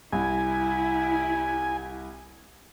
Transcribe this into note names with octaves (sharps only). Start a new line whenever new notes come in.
C2 E4 G#5